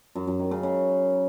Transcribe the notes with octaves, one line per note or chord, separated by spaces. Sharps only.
F#2
F#2
D#3
C#3
C#3